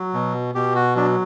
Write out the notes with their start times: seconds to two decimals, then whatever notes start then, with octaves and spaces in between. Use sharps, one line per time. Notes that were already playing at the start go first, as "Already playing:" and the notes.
Already playing: F#3
0.14 B2
0.55 B2 G4
0.75 F#4
0.96 F#3 D4